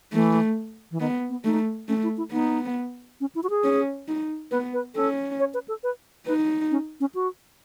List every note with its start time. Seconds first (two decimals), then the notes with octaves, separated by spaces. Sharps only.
0.13 E3 A3
0.91 E3
1.00 D#3 B3
1.30 B3
1.45 A3 D#4
1.88 A3 C#4
2.03 E4
2.18 E4
2.32 B3 D#4
3.21 C#4
3.35 E4
3.43 F#4
3.50 G#4
3.64 C#4
4.08 D#4
4.51 B3 B4
4.74 B4
4.95 C#4 A4
5.40 C#5
5.54 B4
5.68 A4
5.83 B4
6.27 D#4 B4
6.71 C#4
7.00 C#4
7.15 F#4